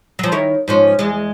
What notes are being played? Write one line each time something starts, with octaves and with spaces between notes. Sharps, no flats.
F3 F#3
D#3 E4 C#5
G#2 F3 C#4
E2 G#3